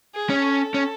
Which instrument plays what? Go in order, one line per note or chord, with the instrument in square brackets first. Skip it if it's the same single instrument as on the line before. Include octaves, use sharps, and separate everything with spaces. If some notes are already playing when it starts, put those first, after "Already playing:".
[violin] G#4
[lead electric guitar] C#4
[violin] A4
[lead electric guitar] C#4